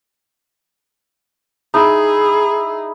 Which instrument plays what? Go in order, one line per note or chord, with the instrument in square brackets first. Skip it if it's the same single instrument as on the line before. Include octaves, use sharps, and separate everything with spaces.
[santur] D#4 E4 [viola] G#4